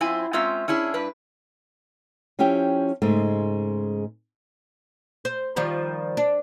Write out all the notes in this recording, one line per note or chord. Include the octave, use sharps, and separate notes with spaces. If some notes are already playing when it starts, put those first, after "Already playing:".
F#2 C4 E4 F4 G#5
G#3 C4 C#4 F4 E5 A#5
C#4 D4 E4 G#4
G2 D4 B4
F3 C#4 E4 G4 G5
G#2 C#3 G#3 A3
C5
D#3 F3 G3
D4